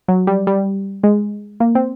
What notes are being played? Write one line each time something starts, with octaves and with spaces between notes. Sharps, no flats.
F#3
G3
G3
G#3
A#3
C4